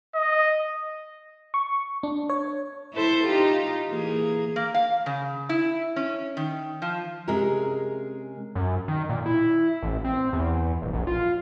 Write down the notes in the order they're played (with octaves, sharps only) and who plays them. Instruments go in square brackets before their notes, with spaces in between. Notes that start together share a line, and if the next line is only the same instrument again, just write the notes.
[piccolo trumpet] D#5
[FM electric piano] C#6
D4
C#5
[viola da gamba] E4 A4 C5
D#4 F4 G4
E3 A#3 G#4
[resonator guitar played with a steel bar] A#3
F5
C#3
E4
C#4
D#3
F3
[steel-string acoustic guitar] C3 G#3 C#4 G#4 A#4
[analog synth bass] F#2
D#3
A#2
E4
A1
C4
E2
D#1
A#1
F4